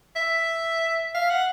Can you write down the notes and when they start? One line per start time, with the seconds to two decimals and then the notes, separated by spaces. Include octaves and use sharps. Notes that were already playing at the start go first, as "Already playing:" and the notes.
0.16 E5
1.14 F5
1.30 F#5